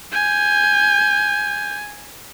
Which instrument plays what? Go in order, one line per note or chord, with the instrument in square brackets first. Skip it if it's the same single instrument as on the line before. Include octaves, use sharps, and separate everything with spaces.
[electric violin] G#5 [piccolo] G6